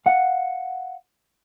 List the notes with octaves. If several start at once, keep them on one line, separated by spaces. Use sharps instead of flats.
F5 F#5